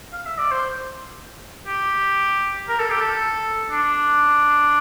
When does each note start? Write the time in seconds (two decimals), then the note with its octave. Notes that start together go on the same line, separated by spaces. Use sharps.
0.13 F5
0.25 E5
0.38 D5
0.51 C5
1.66 G4
2.68 A#4
2.79 A4
2.90 G4
3.01 A4
3.71 D4